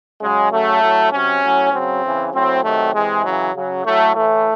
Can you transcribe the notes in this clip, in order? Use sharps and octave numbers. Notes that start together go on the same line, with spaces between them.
C#3 F#3 G#3
C#3 F#3 A3
A2 F#3
C3 F#3 C#4
A2 F#3
C#3 F#3 C4
C#3 E3
A2 F#3 C4
C3 D#3 F#3 A3
C3 E3 G#3
C#3 E3 F#3
C#3 F#3
A2 F#3 A3
A2 E3 A3